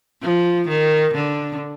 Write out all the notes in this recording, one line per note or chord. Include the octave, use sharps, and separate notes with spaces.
F3
D#3
D3